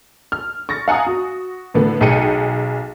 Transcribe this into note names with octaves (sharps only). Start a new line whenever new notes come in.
F6
C#6 A6 A#6
F5 F#5 G#5 A#5 D#6
F#4
A2 D3 B3
B1 G#4 G5 C#7 D#7